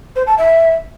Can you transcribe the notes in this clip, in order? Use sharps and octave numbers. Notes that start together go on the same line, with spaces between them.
C5
A5
E5